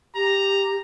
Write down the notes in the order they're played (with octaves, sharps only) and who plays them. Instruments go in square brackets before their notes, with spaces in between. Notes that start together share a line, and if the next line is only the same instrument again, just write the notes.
[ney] G4 [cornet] A#5